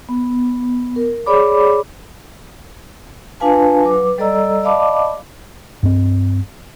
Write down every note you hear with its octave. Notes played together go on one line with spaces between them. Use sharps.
B3
A#4
G#4 C#5 D5 B5 D6
D4 F4 B4 F5 G#5 A5
F#3 B4 D6
G3 A4 D5 D#5 A#5 E6
D5 D#5 F5 A5 B5 D6
G2 C4